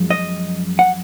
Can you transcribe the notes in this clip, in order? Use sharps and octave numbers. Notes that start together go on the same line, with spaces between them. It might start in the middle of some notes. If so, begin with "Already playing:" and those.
Already playing: F#2 F3 G#3
D#5
F#5